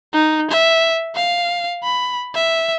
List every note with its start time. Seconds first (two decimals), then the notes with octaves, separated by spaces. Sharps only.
0.13 D#4
0.51 E5
1.16 F5
1.83 B5
2.35 E5